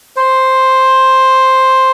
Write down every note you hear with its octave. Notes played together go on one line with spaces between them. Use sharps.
C5